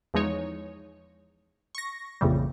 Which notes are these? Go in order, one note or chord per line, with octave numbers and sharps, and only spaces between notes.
E2 F3 G#3 D#4 C#5
C#6 A#6
A#1 F2 A#2 C#3 E3 G3